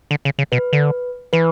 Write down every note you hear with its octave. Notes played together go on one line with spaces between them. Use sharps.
D3
C#3
C#3
B2 B4
D3
E3 B4